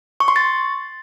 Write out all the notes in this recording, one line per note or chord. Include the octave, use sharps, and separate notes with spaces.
C#6
C6
A6